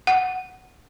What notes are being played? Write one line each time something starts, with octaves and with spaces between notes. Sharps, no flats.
F#5